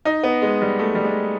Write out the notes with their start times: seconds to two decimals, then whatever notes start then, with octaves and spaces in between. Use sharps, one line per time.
0.05 D#4
0.23 B3
0.42 G#3
0.62 G3
0.79 A3
0.95 G3
1.04 G#3